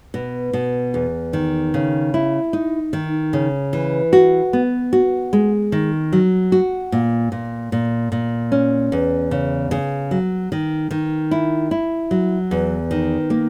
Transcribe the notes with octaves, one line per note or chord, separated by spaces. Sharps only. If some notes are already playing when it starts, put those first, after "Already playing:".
B2
B2
E2
D#3
C#3
E4
D#4
D#3
C#3
E3
F#4
B3
F#4
G#3
D#3
F#3
F#4
A#2
A#2
A#2
A#2
C#4
E2
C#3
C#3
F#3
D#3
D#3
E4
E4
F#3
E2
D#3
A#3